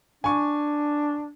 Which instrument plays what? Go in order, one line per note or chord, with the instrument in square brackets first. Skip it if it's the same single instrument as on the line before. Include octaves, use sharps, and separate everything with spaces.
[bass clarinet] D4 [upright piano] G#5 C#6